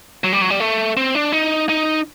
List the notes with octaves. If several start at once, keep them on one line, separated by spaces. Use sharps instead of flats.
F#3
G3
F#3
G3
A3
C4
D4
D#4
D#4